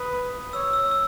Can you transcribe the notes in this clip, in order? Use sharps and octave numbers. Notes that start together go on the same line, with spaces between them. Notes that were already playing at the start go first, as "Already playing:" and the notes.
Already playing: B4 D#6
C#5 E6
E6
E6